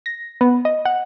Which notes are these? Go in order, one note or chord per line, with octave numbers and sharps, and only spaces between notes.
A#6
B3
D#5
F#5